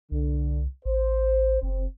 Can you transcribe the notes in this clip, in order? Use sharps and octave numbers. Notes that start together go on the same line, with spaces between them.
C2 D3
A1 C5
F#1 C4